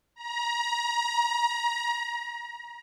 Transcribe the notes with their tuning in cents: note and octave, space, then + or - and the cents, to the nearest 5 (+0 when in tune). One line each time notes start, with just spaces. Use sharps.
A#5 +30